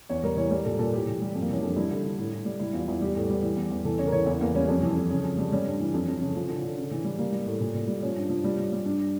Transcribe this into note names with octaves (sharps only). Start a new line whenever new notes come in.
E2 C#5
G3 A#4
E3 C#5
G3 A#4
A#2 A4
A#2 A4
A2 G4
E3
G3
F2
A#3
E3 C#4
F2 D4
G3 E4
D3
D3
A2
A2
G3
G3 E4
E2 F4
E2 E4
G3 G4
A2
G3
E3
E2
E2
E3 A4
C#3 C#5
A#4
E3 C#5
E2 E4
E2 A#3
G3 C#4
F2 C#4
E3
F2
C#3
F2
G3
G3 C#4
G2
E3
F2
F2
C#3
F3
D3
D3
C#3
E3
G3
G3 A#3
G3
A2
A#2
A#2
G3
F3 C#4
G2
F3
G3
G3
G3
G2 D4